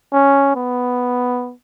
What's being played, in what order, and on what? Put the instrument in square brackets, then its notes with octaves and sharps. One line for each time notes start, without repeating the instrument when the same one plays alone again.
[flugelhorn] C#4
B3